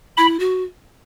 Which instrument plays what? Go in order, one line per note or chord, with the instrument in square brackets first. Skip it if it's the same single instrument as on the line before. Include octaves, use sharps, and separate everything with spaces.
[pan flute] E4 [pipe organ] B5
[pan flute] F#4